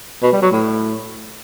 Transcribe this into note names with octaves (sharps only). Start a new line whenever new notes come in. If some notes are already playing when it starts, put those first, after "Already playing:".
B2
G3
F#3
A2